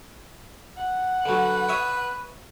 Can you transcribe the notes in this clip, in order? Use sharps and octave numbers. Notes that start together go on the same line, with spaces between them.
F#5
D3 F#3 B4
C#5 E5 D#6